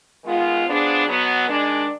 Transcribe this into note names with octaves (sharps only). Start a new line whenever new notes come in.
D#3 G#3 B3 F4
F3 B3 D4 G#4
B2 F#3 B3
D#3 G#3 D4